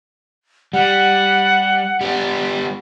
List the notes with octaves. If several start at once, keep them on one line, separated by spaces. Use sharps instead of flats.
G3 F#5
G3 B3